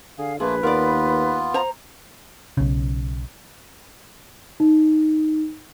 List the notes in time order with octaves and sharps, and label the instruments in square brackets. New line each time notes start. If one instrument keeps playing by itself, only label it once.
[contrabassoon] D3 [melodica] G#4 [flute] F5
[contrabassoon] A#1 [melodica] A3 A#3 F4 [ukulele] G#4 [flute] B4
[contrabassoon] D#2 [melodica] B3 F4 [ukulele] A#4 D5
[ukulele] C5 A#5
[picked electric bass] B1 C#3
[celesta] D#4